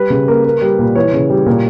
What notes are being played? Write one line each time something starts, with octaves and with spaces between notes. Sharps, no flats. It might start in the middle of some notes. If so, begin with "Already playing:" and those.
Already playing: G3 B4
C#3
A#3
A#3
G3
A#2
E3 C#5
C#3
G3
A#2